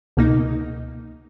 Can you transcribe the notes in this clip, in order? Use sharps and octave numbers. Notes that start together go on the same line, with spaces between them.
C#2 B2 A#3 D#4